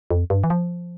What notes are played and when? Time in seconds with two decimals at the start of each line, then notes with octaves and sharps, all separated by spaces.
0.11 F2
0.30 G2
0.44 E3
0.50 F3